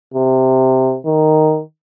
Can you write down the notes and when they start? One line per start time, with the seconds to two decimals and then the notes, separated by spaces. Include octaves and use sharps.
0.14 C3
1.06 D#3